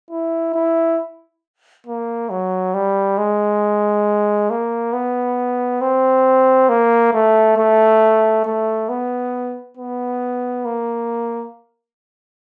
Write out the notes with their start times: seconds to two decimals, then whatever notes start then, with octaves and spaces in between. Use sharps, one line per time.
0.11 E4
0.54 E4
1.87 A#3
2.30 F#3
2.74 G3
3.18 G#3
4.50 A#3
4.93 B3
5.81 C4
6.69 A#3
7.13 A3
7.57 A3
8.45 A3
8.89 B3
9.77 B3
10.65 A#3